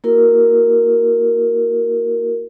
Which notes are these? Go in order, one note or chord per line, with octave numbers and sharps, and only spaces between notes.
A#3 E4 F#4 A#4